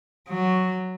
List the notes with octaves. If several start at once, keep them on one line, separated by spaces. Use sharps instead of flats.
F#3